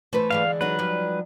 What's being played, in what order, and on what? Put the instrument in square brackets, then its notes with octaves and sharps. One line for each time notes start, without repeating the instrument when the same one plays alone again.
[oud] E3 C5 [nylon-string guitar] A3 B4
[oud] D3 E3 G#3 [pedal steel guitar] F5
[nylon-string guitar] F#3 C#4 D#4 [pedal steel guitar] B4
[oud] F3 G3